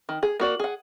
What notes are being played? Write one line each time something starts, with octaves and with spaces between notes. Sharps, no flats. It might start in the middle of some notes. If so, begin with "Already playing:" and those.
D#3
G#4
A#3 F#4 D5
G#4 F#5